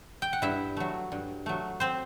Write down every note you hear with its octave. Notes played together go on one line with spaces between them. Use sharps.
G5
F#5
G2 E4 E5
F#3 A3
G2
F#3 A3
C4 C5